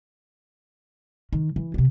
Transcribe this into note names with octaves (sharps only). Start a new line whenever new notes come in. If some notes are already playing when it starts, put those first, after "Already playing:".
D#3
E3
C3 B3